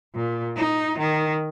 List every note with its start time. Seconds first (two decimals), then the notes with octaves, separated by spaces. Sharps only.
0.15 A#2
0.56 D#4
0.98 D#3